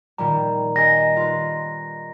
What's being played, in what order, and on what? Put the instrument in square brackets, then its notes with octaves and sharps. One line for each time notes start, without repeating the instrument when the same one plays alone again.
[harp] A#2 D#3 G3 [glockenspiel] A#5
[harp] G4 D#5 G#5 [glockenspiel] A#6
[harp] F4 B4